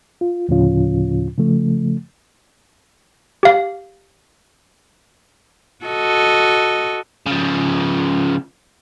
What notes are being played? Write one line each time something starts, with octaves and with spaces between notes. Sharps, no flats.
F4
D2 A2 C#3 F3 C#4 F4
C#3 F3 A3
G4 F5
F#4 A4 D#5
C#3 F3